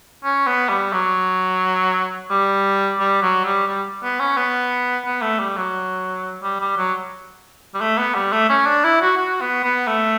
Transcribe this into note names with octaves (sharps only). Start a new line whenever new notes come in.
C#4
B3
G3
F#3
G3
G3
F#3
G3
G3
B3
C#4
B3
B3
A3
G3
F#3
G3
G3
F#3
G3
A3
B3
G3
A3
C#4
D4
E4
F#4
F#4
B3
B3
A3